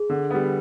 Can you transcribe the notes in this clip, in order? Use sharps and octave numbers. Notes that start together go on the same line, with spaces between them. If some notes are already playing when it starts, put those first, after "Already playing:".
Already playing: G#4
D3
G3 B3